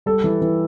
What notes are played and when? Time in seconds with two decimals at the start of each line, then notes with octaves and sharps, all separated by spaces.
0.06 G3 A4
0.24 E3
0.41 E3